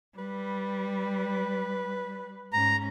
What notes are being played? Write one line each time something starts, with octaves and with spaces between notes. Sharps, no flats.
G3 B4
G#2 C#4 A#5